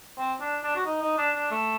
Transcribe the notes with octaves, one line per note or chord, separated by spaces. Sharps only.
C4
D4
D4
F#4
D#4
D#4
D4
D4
A3